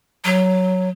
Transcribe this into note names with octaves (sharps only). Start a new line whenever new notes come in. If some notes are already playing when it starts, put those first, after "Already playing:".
F#3